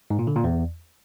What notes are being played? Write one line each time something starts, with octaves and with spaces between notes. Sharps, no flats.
G#2
A#2
D3
A#2
E2